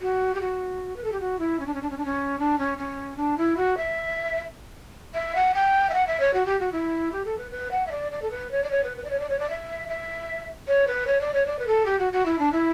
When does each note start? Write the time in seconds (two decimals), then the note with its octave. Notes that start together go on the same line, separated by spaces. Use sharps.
0.01 F#4
0.35 G4
0.41 F#4
0.96 B4
1.04 A4
1.12 G4
1.20 F#4
1.39 E4
1.60 C#4
1.67 D4
1.74 C#4
1.82 D4
1.90 C#4
1.98 D4
2.05 C#4
2.39 D4
2.58 C#4
2.78 C#4
3.17 D4
3.38 E4
3.57 F#4
3.77 E5
5.14 E5
5.35 F#5
5.54 G5
5.90 E5
5.94 F#5
6.07 E5
6.20 C#5
6.34 F#4
6.46 G4
6.60 F#4
6.72 E4
7.13 G4
7.25 A4
7.38 B4
7.51 B4
7.71 F#5
7.87 E5
7.91 D5
8.12 D5
8.22 A4
8.31 B4
8.51 C#5
8.63 D5
8.71 C#5
8.84 B4
8.97 B4
9.04 D5
9.11 C#5
9.20 D5
9.29 C#5
9.39 D5
9.50 E5
9.89 E5
10.68 C#5
10.87 B4
11.07 C#5
11.21 D5
11.34 C#5
11.46 D5
11.59 B4
11.67 A4
11.86 G4
11.99 F#4
12.13 F#4
12.26 E4
12.39 D4
12.52 E4